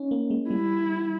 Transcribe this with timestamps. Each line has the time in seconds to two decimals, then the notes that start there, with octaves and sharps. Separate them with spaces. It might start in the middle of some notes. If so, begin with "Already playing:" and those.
Already playing: C#4 D#4
0.11 A#3
0.30 G#3
0.50 G3 E4